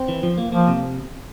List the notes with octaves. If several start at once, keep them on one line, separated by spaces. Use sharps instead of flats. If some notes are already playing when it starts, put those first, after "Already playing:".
Already playing: C4
E3
F3
A#3
F3 A#3
C3